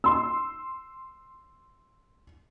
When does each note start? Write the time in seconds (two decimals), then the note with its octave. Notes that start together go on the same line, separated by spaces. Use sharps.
0.04 C6 E6